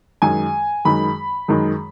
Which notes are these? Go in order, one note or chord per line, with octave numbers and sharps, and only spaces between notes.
F#2 D#3 G#3 G#5
F#2 D#3 G#3 B5
F#2 D#3 G#3